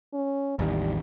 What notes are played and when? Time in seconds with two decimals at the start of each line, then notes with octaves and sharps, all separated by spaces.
0.14 C#4
0.59 A1 E2 D#3 G3